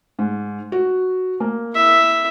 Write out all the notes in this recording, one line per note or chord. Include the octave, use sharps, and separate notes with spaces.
G#2
F#4
A#3
E4 E5